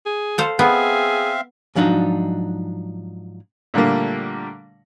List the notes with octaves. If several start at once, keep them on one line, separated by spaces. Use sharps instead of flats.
G#4
A4 C5 F5
B3 C4 G#4 E5 F5
G#2 F3 F#3 D4 D#4
A#2 D3 G3 A3 A#3